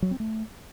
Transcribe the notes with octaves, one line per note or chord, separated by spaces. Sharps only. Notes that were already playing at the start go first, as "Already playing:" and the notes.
F#3
C4
A3